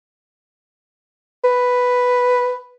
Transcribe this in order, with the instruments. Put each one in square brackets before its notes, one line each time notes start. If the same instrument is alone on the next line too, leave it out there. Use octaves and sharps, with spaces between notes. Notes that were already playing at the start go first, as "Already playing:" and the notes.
[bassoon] B4